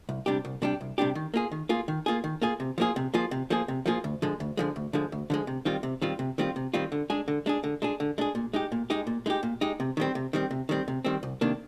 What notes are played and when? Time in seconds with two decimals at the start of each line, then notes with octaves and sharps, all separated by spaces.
0.09 C2
0.26 C3 G3 D4 G4
0.45 C2
0.62 C3 G3 D4 G4
0.81 C2
0.98 C3 G3 D4 G4
1.15 D#3
1.34 A#3 F4 G#4
1.52 D#3
1.69 A#3 F4 G#4
1.88 D#3
2.06 A#3 F4 G#4
2.24 D#3
2.42 A#3 F4 G#4
2.60 C3
2.78 F3 A#3 F4 G#4
2.96 C3
3.14 F3 A#3 F4 G#4
3.31 C3
3.50 F3 A#3 F4 G#4
3.68 C3
3.86 F3 A#3 F4 G#4
4.04 D2
4.22 D3 F3 G#3
4.40 D2
4.57 D3 F3 G#3
4.76 D2
4.93 D3 F3 G#3
5.12 D2
5.30 D3 F3 G#3
5.47 C3
5.65 D#3 G3 C4 F4
5.83 C3
6.02 D#3 G3 C4 F4
6.19 C3
6.38 D#3 G3 C4 F4
6.56 C3
6.74 D#3 G3 C4 F4
6.92 D3
7.10 G#3 D4 G#4
7.28 D3
7.46 G#3 D4 G#4
7.64 D3
7.82 G#3 D4 G#4
8.00 D3
8.18 G#3 D4 G#4
8.35 A#2
8.53 G#3 D#4 G4
8.72 A#2
8.90 G#3 D#4 G4
9.07 A#2
9.26 G#3 D#4 G4
9.43 A#2
9.61 G#3 D#4 G4
9.80 C3
9.97 D#3 G3 C4
10.15 C3
10.33 D#3 G3 C4
10.51 C3
10.69 D#3 G3 C4
10.88 C3
11.05 D#3 G3 C4
11.23 C2
11.41 C3 D#3 A#3 D4